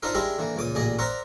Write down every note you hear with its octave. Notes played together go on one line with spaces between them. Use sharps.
D4 D#4 F4 A#4 C5 E5
G#3 D4 E4 G4 A#4 E5
D3 E3 A#3
C#2 A#2 D6 D#6
A1 A#2 G#4 D5 D#5
A#4 C5 D5 E5 F#5 A#5